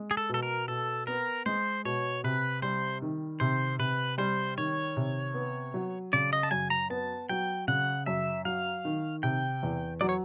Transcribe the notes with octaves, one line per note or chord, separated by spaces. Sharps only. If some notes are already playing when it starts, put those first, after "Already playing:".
Already playing: G#3
G#4
A4
B2 A4
A#4
B2 A4
B3 A#4
G#3 C5
B2 C#5
C3 B4
G3 C5
D#3
C3 C5
C3 B4
G3 C5
D#3 C#5
C3
B3
F#3
C#3 D5
D#5
A5
F#2 G#5
A#5
B3 A5
F#3 G5
C#3 F#5
F#2 E5
F#3 F5
D#3
C3 G5
E2
F#3 D5
C#5